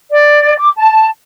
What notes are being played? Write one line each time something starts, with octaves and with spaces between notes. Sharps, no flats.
D5
D6
A5